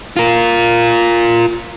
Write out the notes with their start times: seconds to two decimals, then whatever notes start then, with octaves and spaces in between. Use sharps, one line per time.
0.17 F4 A#4